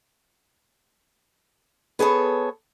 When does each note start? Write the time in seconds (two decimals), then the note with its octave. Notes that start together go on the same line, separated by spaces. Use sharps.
1.99 B3 G#4 A4 C#5